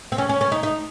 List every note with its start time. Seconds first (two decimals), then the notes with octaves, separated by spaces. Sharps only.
0.12 C4
0.18 C#4
0.29 C#4
0.41 C#4
0.52 D#4
0.63 D#4